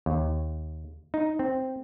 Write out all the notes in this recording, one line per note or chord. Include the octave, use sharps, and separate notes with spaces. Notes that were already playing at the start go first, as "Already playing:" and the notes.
D#2
D#4
C4